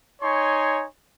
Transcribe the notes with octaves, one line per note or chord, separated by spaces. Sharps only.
D#4 C#5 G#5 C6 C#6